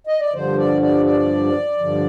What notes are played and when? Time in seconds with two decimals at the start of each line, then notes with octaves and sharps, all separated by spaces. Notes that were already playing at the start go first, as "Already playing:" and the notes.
0.07 D#5
0.20 D5
0.34 G2 D3 F3 C5
0.58 D5
0.82 D5
1.06 D5
1.79 G2 D3 F3